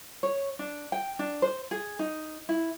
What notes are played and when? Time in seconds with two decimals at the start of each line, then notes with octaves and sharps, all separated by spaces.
0.23 C#5
0.59 D4
0.92 G5
1.19 D4
1.42 C5
1.71 G#4
1.99 D#4
2.49 E4